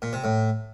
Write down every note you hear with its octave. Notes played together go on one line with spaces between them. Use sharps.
A#2
C3
A2